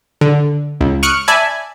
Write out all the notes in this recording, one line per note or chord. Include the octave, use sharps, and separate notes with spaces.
D3
C#2
C#6 D#6 F6 F#6 C#7 D7
D5 E5 G#5 A5 B5 G#6